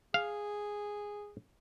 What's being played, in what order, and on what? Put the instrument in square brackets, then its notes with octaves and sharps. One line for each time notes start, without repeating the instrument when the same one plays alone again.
[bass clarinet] G#4 [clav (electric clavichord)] F5